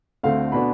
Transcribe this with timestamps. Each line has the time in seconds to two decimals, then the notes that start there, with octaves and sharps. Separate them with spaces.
0.23 D2 D3 A3 C4 F5
0.52 B2 B3 D4 B5